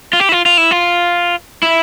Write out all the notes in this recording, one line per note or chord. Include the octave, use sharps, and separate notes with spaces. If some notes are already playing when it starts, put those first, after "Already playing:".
F4
G4
E4
F4
F4
E4
F4
E4